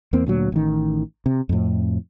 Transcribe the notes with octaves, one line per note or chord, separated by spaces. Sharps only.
E2 A#3 C4
D2 A#2 F#3
A1 D#3
C3
F2 A2